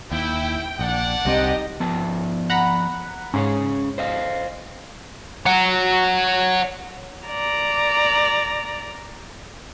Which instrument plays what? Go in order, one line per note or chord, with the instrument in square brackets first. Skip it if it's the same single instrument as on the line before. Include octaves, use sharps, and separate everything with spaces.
[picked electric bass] D#2 [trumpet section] E4 [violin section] G5
[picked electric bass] A#1 [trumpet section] D4 D5 F#5
[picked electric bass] C2 G3 C4 [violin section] D#4 G4 D#5
[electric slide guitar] F3 B3 A5
[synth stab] F#5 A#5 B5
[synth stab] G#2 [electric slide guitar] C#4 G#4 C#5
[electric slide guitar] C5 D#5 F5
[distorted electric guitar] C#5 F#5
[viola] D5 A#5